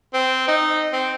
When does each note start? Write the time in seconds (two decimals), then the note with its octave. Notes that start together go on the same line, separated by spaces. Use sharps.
0.14 C4
0.48 D#4
0.93 C4